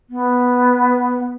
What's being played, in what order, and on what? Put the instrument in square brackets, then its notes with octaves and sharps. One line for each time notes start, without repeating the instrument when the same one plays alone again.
[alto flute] B3